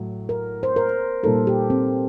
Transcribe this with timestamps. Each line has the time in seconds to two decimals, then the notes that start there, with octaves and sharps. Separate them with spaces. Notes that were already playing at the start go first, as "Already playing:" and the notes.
Already playing: A2 F#3
0.29 A#4
0.63 C5
0.76 A#4
1.23 A#2 G3 A#3 D#4 A4
1.47 G4
1.70 C4